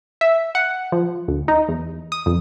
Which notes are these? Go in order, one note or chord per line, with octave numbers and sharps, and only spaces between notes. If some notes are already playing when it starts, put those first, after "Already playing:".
E5
F#5
F3
D2
D#4
E2
D#6
F2